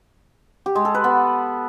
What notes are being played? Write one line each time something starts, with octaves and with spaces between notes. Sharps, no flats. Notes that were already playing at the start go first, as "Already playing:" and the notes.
G4
G#3
A4
B4
B3